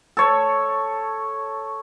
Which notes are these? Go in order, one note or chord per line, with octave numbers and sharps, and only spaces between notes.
A4 C#5